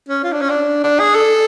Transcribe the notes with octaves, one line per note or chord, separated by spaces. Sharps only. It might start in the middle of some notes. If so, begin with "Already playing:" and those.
C#4
F4
D4
C#4
D4
D4
G#4
A4